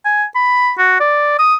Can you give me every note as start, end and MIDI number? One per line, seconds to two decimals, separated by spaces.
0.05 0.25 80
0.35 0.72 83
0.78 0.98 66
1.00 1.38 74
1.39 1.55 87